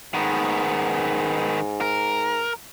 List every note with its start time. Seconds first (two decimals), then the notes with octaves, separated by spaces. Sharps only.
0.14 G#2 D#3 B3
1.81 A#4